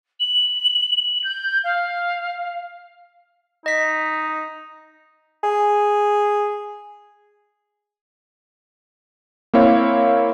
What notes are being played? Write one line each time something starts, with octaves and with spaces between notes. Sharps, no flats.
F#7
G6
F5
D#4 D#5 B6
G#4
A#3 C4 E4 C#5 F5